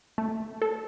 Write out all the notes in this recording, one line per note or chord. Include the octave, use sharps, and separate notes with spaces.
A3
A4